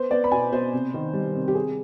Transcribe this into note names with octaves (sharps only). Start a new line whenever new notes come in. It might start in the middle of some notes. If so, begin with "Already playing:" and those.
Already playing: B3 C5
B3 D5
B5
B2 G#5
B2 C5
C3
D#3
G3
C3
G4
C3 G#4